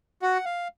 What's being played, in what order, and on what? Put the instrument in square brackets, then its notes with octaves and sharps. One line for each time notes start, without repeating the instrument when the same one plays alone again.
[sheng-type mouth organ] F#4 [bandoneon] F#5
[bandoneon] F5